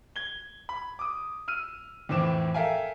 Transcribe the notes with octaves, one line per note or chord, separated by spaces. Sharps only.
G#6 G7
B5
D6 D#6
E6 F6 D#7
F2 A2 E3 C4 D6 E7
A4 A#4 E5 F5 G5 G#5